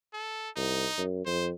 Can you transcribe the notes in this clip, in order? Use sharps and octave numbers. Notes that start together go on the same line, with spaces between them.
A4
C2 D#4
F#2
F2 C5